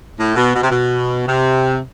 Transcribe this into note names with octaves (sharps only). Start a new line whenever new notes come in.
A2
B2
B2
C3
B2
C3